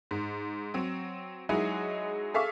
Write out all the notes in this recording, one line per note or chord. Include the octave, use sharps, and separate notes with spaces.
G#2
F#3 C4
F#3 G#3 D#4 E4 F#4 G#4
G#4 A4 E5 F5 C#6 D6